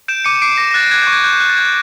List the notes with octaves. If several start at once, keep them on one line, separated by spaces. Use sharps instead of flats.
G6 D7 E7
D6 C#7 D#7
D6 C7 D7
D6 A#6
A#6
F#6 A6
F#6 G#6
G6
C#6
G#6
F#6 G6
F#6
A6
G6 G#6